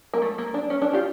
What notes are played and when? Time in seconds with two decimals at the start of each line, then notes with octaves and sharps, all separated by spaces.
0.14 A#3
0.22 A3
0.38 A#3
0.54 D4
0.70 C#4
0.82 D4
0.93 F4 G4